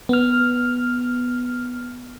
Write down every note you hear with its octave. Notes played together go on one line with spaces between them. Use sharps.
B3 F6